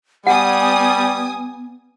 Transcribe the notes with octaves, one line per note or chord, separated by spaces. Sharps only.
G3 B3 F#5 G#5 D#6